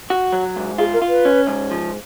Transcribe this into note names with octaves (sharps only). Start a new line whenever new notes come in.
F#4
F#3
G#2
F4 G#4
A#4
F4
B4
C#4
G#2
F3